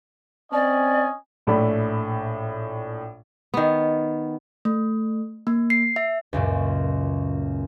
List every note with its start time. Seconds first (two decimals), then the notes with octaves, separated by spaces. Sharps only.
0.53 C4 C#4 D5 D#5 G#5
1.47 A#1 A2 A3 D5 B5
3.54 D#3 B3
4.65 A3
5.47 A#3
5.70 C7
5.96 E5
6.33 C#2 F#2 A#2